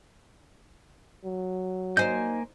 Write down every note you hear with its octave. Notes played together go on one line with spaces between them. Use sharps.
F#3
A#3 D#4 C5 G#5 G6